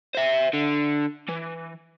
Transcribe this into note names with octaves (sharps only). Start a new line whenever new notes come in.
C5 E5
D3
E3